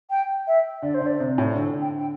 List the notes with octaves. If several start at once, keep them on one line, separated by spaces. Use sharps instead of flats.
G5
E5
D3 D5
C5
D3 D5
C3
A2
D3 A4
G5
G5